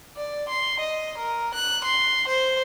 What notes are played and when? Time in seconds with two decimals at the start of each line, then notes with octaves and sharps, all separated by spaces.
0.16 D5
0.48 C6
0.80 D#5
1.18 A#4
1.54 F#6
1.84 C6
2.28 C5